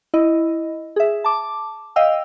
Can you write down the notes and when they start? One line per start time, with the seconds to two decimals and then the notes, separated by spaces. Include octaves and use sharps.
0.14 E4 D#5
0.96 G#4 E5
1.24 A5 D6
1.96 D#5 F5 G5 E6